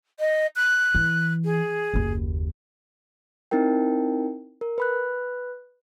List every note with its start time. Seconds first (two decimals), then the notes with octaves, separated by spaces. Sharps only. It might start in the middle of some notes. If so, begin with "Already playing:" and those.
0.19 D#5
0.56 F#6
0.95 E3
1.44 G#4
1.94 F#1 D#2
3.51 C4 D#4 E4 A#4 G5
4.61 A#4
4.78 B4 B5 F#6